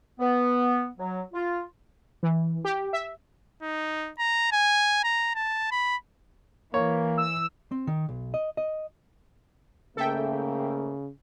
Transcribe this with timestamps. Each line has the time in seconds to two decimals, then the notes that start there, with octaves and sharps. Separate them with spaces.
0.19 B3
0.98 F#3
1.33 F4
2.23 E3
2.65 G4
2.93 E5
3.62 D#4
4.19 A#5
4.52 G#5
5.04 A#5
5.35 A5
5.71 B5
6.74 E3 A#3 C#5
7.18 E6
7.71 C4
7.87 D#3
8.09 B1
8.34 D#5
8.57 D#5
9.97 G#2 C#3 A3 A#3 A4 E5 G5